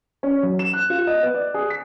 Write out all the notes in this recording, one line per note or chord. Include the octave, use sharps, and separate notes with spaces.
C#4
F#2
E7
F#6
F4
D#5
B3
D5
G#4
B6